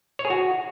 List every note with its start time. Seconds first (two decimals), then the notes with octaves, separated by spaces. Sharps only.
0.19 C#5
0.25 G#4
0.30 F#4